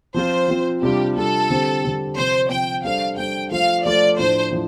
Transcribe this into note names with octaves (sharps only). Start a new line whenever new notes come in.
F3 C4 F4 C5
F3 C4 F4
C3 G3 D4 F4 G4
C3 G3 D4 F4 A4
D3 G3 C4 G4 C5
D3 G3 C4 G4 C5
C3 F3 C4 C5
C3 F3 C4 G5
G3 D4 A4 C5 F5
G3 D4 A4 C5 G5
F3 A3 F4 A4 C5 F5
F3 A3 F4 A4 C5 D5
A2 F3 D4 C5
A2 F3